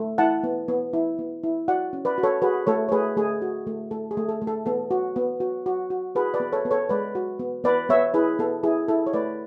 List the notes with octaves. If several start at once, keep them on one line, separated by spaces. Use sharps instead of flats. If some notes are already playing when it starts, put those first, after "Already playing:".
Already playing: A3
E4 F#5 A5
B3
B3
E4
B3
E4
F#4 D5 F#5
C#4
B4 D5
F#4
A4 C#5
F#4 G#4 B4
A3 A4 C#5
C#5
A3 G#4 B4
A3 G#4
F#4
A3
A3 A4
G#4
A3
A4
A3
A4
B3 A4
F#4
B3
F#4
F#4
F#4
F#4 G#4 B4
B4 D5
B3
A4 C#5
B3
A4 C#5
G#3 B4 D5
F#4
B3
B3 B4 D5
B3 C#5 E5
E4 G#4 B4
B3 A4
E4 G#4
E4 A4
C#5
A3 B4 D5